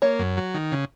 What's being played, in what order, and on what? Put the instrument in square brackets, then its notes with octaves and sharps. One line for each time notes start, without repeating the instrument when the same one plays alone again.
[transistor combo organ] A#3 [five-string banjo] C#5
[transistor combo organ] F#2
F#3
D#3
C#3